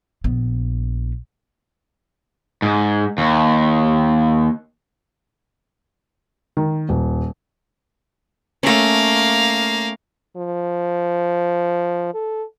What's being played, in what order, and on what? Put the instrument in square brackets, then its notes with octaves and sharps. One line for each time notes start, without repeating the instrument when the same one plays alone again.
[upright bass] A#1 B3
[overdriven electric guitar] G#2
D#2
[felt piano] D#3
D#1
[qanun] A3 C#4 [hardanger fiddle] A#3 F5
[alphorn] F3
A4